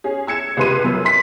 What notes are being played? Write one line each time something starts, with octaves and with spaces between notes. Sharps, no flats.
C#4 G#4
E6 G#6 C#7 E7
C#2 C3 B4 C6 D#7
F#2
C6 B6